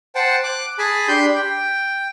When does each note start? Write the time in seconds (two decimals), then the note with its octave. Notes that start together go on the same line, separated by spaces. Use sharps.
0.15 C5 F#5 G5 A5
0.44 D6 F#6
0.78 G#4 G#5 A5 B5
1.08 D4 G4 B5 C6 G6
1.35 G5